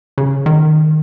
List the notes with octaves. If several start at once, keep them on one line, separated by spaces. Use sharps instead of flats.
C#3
D#3